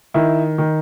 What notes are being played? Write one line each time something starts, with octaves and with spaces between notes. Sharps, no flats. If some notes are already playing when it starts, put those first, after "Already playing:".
D#3 E4
D#3